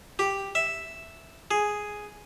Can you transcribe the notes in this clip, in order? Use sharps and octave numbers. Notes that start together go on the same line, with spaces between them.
G4
E5
G#4